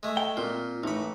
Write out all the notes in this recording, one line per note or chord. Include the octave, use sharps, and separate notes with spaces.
G#3 A3
G5
A#2 C4 F4
A1 A3 D#4 B5